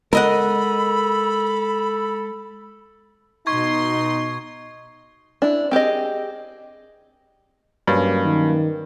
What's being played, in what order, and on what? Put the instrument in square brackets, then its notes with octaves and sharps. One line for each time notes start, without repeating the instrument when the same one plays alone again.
[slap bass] G#3 [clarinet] A4 [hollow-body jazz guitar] A#4 D#5 F#5 [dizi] B5
[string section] B2 C6 [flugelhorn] D#4 [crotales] C#6 G#6
[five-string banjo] D4 E4
C4 G4 G#4 D#5
[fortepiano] G2 [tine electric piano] F#3 A#3 C#4
[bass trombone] D#3